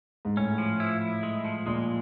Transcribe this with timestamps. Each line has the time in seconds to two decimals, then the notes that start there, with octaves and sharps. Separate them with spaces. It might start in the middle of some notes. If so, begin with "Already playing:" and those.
0.25 G#2
0.37 A2 C#4
0.58 F3
0.80 E4
1.01 E4
1.23 G#3
1.45 F3
1.66 A#2 G#3